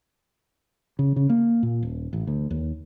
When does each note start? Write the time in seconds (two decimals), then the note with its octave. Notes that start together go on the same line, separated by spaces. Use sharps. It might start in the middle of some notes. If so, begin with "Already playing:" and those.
0.99 C#3
1.16 C#3
1.30 A#3
1.63 A#2
1.83 D#1
2.13 A1
2.27 D2
2.51 D#2